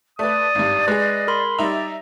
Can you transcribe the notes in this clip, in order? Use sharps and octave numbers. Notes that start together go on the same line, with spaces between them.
A3 B4 D5 D#6
G#1 G2
G#3 G#4 B4 D#5
A#4 B5 C6
G3 D#4 D5 E5 A#5